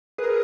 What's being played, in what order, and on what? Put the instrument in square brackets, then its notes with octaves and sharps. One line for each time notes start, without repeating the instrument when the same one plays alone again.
[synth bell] G#4 B4 [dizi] A#4